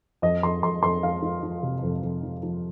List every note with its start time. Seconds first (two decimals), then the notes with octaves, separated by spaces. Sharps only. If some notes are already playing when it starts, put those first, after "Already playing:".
0.22 F2 D#5
0.43 F2 C6
0.63 F2 C6
0.83 F2 C6
1.03 F3 F5
1.22 F3
1.43 F3
1.63 C3
1.83 F2
2.03 F2
2.23 F3
2.43 F3